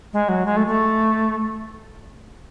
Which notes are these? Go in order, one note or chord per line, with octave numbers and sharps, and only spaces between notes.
G#3
F#3
G#3
A3
A3